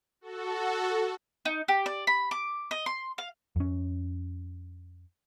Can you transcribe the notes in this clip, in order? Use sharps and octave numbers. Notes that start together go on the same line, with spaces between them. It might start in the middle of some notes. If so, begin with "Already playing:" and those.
F#4 A4
D#4
G4
D5
B5
D6
D#5
C6
F5
F2 C#4